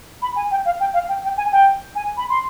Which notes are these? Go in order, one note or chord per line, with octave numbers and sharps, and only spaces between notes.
B5
G#5
G5
F5
G5
F5
G5
G5
G#5
G5
G#5
B5
C6